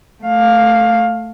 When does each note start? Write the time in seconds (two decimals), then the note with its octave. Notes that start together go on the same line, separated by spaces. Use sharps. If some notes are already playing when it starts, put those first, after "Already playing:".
0.24 A3 F5